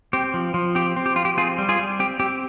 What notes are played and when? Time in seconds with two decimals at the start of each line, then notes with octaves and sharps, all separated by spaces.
0.13 C4 G4
0.34 F3
0.54 F3
0.75 C4 G4
0.96 C4
1.06 G4
1.16 F3 F4
1.25 G4
1.37 C4 F4 G#4
1.58 G3
1.69 F4 G#4
1.79 G3
1.99 C4 G4
2.20 C4 G4